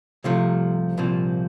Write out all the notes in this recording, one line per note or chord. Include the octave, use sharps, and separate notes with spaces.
C2 C3 F3 A3
C2 A#2 F3 C4